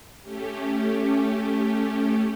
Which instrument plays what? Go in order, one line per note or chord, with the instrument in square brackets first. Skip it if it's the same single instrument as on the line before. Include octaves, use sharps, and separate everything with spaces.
[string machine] A3 C#4 G4